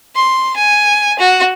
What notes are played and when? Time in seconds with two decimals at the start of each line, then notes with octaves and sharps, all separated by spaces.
0.15 C6
0.56 G#5
1.19 F#4